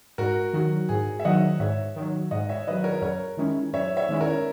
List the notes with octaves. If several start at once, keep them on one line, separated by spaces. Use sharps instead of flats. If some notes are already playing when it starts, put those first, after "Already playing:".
G#2 F#4 A#4
D#3 F#3 F#4
G#2 G#4
E5
D#3 F#3 D#5 F#5
G#2 C#5 E5
D#3 F#3
G#2 D#5 F#5
C#5 E5
D#3 F#3 B4 D#5
A#4 C#5
F#2 A#4 C#5
D#3 G#3 C#4 E4
F#2 C#5 E5
C#5 E5
D#3 G#3 C#4 E4
A#4 C#5